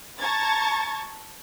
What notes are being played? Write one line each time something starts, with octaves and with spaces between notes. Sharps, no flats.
A5 A#5 C#6 G#6 A6